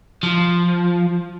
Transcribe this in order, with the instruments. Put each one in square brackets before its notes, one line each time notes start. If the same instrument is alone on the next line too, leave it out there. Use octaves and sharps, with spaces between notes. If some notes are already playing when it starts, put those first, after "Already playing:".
[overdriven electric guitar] F3